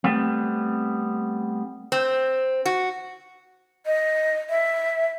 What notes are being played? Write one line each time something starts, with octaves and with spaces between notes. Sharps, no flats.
G3 A3 B3 C4
C4
F#4
D#5
E5